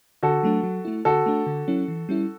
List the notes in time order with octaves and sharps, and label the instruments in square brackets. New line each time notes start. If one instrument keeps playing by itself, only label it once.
[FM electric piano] D3 [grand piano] F#4 A4
[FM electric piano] F#3 A3 D4
F#3
A3 E4
[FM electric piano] D3 [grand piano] F#4 A4
[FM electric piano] A3 D4
D3
F#3 C#4 E4
E3
G3 C#4 E4